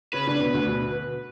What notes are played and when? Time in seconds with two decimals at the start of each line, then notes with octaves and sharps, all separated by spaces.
0.13 C#3 C#4 B4
0.27 D3 D4
0.41 B2 B3
0.54 D2 D3
0.68 B2